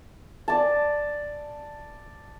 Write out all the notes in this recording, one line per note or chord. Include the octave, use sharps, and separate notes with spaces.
D5 A5